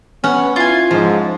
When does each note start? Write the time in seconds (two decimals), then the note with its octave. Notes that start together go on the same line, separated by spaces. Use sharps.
0.24 B3 C#4 F#5
0.56 E4 F4 G#5
0.91 G#2 F3